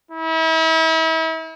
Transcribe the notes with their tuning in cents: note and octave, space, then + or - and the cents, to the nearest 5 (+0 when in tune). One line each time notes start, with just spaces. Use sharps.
E4 -40